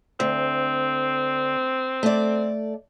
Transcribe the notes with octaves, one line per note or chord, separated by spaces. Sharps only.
D2 C4
A3 D5